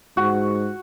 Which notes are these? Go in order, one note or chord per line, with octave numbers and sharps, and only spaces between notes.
G#2 F#4